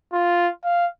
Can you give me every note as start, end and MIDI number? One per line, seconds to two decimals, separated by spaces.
0.12 0.48 65
0.64 0.86 77